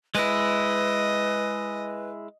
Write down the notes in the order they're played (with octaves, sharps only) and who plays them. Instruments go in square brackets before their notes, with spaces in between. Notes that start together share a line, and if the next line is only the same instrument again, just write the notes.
[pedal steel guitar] G#3 E4 [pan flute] B4 [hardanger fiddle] D#5